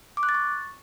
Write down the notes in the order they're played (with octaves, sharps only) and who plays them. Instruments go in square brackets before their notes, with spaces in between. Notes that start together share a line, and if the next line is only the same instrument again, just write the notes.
[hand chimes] D6
F#6
A6
C#6